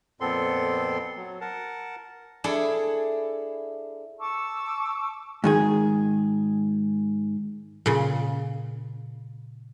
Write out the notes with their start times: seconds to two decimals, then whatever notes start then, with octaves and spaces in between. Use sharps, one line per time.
0.21 F2 A#2 B3 C4 A4 C6
1.16 F#3
1.41 A#4 F#5 A5
2.44 D4 E4 G#4 A4
4.19 A5 C#6 D6 E6
5.44 G#2 D#3 G#4
7.86 A#2 C#3